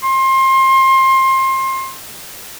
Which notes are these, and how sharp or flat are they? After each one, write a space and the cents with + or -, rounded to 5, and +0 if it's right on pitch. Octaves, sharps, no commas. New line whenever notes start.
C6 +25